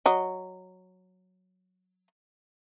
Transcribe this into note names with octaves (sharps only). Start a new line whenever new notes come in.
F#3 D#5